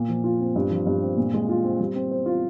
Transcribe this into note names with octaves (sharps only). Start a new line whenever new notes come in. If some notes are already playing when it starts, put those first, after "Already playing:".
Already playing: A#2
F3
F4
C4
G2
F3
G2
C4
A#2
G#3
F4
C4
G3
C4
C5
F4